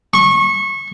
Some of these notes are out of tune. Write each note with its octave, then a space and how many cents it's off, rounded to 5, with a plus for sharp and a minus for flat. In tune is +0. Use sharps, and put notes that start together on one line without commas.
C#6 -25